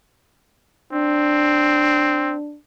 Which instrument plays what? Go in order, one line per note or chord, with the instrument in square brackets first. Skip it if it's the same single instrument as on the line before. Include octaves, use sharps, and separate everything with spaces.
[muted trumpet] C4 [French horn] D4